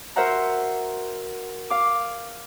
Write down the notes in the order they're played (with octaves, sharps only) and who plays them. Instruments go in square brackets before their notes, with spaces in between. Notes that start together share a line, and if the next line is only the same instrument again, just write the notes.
[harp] F#4 A#4 C5 E5 F#5 A#5
F5 D6